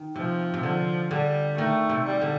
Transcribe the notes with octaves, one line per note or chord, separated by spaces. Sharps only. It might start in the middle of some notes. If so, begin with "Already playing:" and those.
Already playing: D#3
C3 F3
C3
D3 F3
D3 G3
D#3 A3
C3
G3
D3